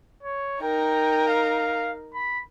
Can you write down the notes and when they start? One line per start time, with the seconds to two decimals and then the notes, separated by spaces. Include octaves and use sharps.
0.23 C#5
0.62 D#4 A#4 G5
1.28 F5
2.14 B5